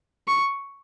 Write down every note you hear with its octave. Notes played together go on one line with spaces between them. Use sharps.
C#6